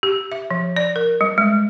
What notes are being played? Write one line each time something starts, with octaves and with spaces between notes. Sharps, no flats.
G4
E5
F3
D5
A#4
G3
G#3